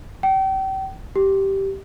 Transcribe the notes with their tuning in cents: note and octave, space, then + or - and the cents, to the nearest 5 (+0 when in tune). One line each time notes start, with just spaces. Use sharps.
G5 -35
G4 -10